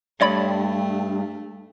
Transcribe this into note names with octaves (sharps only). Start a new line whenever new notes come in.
G2 A3 C#5 D5 B5